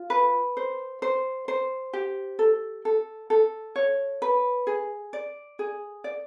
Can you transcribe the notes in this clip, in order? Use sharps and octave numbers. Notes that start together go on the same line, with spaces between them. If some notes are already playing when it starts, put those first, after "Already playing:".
Already playing: F4
B4
C5
C5
C5
G4
A4
A4
A4
C#5
B4
G#4
D5
G#4
D5